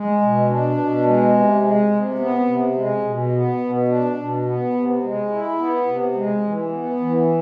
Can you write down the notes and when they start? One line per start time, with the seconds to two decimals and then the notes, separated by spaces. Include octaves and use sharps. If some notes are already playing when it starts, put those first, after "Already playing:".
Already playing: G#3
0.21 B2
0.49 D4
0.77 B2
1.05 G#3
1.34 C3
1.62 G#3
1.91 C3
2.19 B3
2.47 C3
2.75 G#3
3.04 B2
3.32 B3
3.60 B2
3.88 D4
4.17 B2
4.45 B3
4.74 C3
5.02 G#3
5.31 E4
5.59 B3
5.87 C3
6.15 G#3
6.44 E3
6.72 B3
7.00 E3